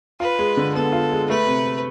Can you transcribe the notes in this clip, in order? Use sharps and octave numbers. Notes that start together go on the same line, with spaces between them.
F4 B4
G#3
D3
B3 A4
F4
G#3
A3 B4
C3